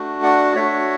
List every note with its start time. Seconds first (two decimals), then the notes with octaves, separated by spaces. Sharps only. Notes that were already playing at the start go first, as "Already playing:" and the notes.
Already playing: A3 D4 F#4
0.23 D5 F#5
0.56 A3 D4 F#4 C#5 E5